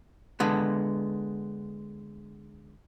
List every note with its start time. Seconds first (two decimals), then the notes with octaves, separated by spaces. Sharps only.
0.40 D3 G#3 B3